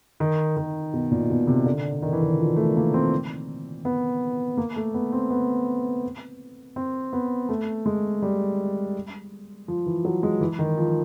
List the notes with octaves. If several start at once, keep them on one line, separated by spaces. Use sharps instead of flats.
D#3
D#3
B2
A#2
B2
C3
D3
D#3
E3
D#3
F3
A3
A#3
C4
B3
A#3
A3
B3
C4
B3
C4
B3
A3
G#3
G3
F3
E3
F#3
G#3
E3
D#3
F3